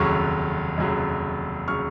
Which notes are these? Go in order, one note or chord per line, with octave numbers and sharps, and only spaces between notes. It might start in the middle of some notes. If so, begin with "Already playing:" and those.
Already playing: F1 D#2 C#3 F#3 C#6 F6
F1 D#2 C#3 F#3
C#3 F#3 C#6 F6